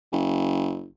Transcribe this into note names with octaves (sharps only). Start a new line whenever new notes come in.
F#1